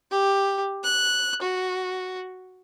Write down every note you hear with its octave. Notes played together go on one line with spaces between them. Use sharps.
G4
F#6
F#4